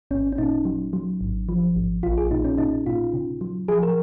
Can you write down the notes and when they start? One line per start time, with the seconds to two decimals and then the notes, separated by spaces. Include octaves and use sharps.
0.11 G#1 C#4
0.32 C#4
0.38 A#2 D#4
0.65 F#3
0.93 F#3
1.21 G#1
1.49 F3
1.76 G#1
2.03 A#1 F4
2.18 G#4
2.31 A#2 D#4
2.45 C#4
2.58 A#2 D#4
2.86 A#2 F4
3.14 C#3
3.41 F#3
3.68 F3 G#4
3.83 A#4